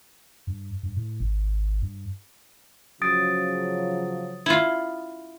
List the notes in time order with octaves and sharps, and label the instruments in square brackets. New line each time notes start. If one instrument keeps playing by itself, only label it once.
[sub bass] G2
G2
A2
G#1
G2
[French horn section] C#3 F3 F#3 [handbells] D#6 A6 D7
[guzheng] E4 F4